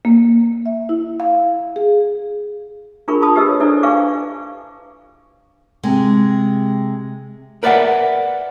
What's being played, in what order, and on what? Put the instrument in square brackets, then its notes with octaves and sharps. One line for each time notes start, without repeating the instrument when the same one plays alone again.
[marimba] A#3
E5
E4
F5
G#4
[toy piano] D4 F4 G#4 A#4 B5 C#6
F4 A5 B5 D#6
G4 B4 D#5 E6
C#5
D4 E4 A4 C5 D5
B4 F5 G#5 C#6 D6
[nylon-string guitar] C3 G#3
[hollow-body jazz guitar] A#4 B4 D5 E5 F#5